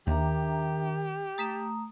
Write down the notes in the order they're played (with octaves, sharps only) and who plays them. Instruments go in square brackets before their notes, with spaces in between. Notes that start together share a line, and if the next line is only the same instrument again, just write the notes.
[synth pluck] D#2 [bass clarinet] D#3 [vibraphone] D4 E5 A#5 [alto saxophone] G4
[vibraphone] A3 A#5 D#6 [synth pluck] A6 B6 E7